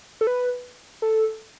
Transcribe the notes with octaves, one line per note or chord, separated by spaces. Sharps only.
A4
B4
A4